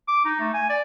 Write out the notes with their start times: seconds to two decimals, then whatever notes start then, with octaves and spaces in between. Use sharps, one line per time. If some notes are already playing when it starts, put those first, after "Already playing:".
0.08 D6
0.25 D#4
0.39 A3
0.54 G#5
0.69 D5